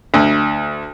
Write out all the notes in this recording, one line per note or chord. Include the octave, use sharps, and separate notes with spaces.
D2